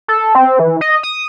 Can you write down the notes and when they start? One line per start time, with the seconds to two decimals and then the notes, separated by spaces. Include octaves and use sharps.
0.08 A4
0.35 C4
0.59 E3
0.81 D#5
1.03 D#6